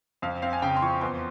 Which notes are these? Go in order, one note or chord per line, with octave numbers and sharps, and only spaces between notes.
F2 F5
C4 F5
G#5
C#3 G5
C6
F3 C#6
E2 C6